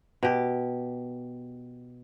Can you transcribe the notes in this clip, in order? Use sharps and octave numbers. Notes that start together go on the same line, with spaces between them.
B2 G4